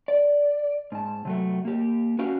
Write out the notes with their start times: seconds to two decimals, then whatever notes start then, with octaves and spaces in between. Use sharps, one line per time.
0.08 D5
0.92 G#2 A5
1.25 C3 F#3 A3
1.65 A#3 G4
2.19 C#4 F#4 B4 F5